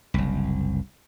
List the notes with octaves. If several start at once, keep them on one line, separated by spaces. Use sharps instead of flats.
F#1 C2